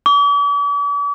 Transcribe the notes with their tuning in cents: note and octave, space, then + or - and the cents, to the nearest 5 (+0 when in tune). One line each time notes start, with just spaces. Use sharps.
D6 -45